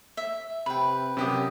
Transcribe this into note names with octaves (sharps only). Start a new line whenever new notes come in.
E5
C3 B4 G5 B5
F#2 C3 G4 D#6